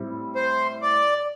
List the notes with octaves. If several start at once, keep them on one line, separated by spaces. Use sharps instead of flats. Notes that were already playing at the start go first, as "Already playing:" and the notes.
Already playing: A2 G3 C4 E4
C5
D5